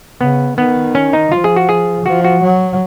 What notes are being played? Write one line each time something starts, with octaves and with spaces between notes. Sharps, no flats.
C#3 B3
D#3 B3
C#4
D#4
F3 F4
G#4
F#4
G#4
F3 F#4
F#4
F#3